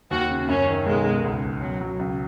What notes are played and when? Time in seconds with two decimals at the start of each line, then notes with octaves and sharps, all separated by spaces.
0.11 D#2 F#4
0.30 C#3
0.49 F#2 C#4
0.68 D#3
0.86 B1 G#3
1.05 B2
1.24 C#2
1.43 B2
1.62 B2 F#3
1.81 F#3
1.99 C#2